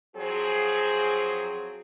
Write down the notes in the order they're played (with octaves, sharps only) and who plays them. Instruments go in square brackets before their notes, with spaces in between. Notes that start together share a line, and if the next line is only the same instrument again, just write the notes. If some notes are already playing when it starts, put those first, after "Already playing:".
[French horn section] F3 F#3 C4 G#4